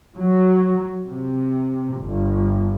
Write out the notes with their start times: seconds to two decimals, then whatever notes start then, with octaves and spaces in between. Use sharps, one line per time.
0.16 F#3
1.05 C3
1.97 G1